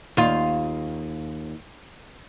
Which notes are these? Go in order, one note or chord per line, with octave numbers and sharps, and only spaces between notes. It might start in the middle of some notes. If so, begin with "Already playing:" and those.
D#2 F4